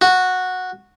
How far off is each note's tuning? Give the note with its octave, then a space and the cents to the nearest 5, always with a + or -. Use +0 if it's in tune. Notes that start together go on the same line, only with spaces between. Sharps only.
F#4 -10